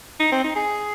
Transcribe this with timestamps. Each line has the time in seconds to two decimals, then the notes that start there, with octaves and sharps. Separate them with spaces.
0.20 D#4
0.32 C4
0.44 D#4
0.55 G#4